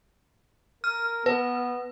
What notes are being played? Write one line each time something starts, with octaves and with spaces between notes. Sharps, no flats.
A#4 F6
B3 B4